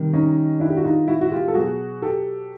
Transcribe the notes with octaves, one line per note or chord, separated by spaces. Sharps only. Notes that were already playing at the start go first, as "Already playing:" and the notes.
Already playing: C3 D#3 G3
C#4 D#4
D4 E4
G4
F#4
D#4 F4
E4 F#4
F#4
F4 G4
A4
B2 F#3 F#4 G#4
G4 A4